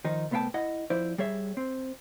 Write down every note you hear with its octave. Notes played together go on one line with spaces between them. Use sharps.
D#3 F3 D#4
C2 A3 B3 F5 G5 A5
E4 D#5 F#5
F2 E4 C5 D5
G3 G#4 C#5 E5
C4